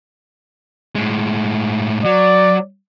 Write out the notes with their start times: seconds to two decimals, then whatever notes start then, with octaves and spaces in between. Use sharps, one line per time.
0.95 A2 G#3
2.05 F#3 D5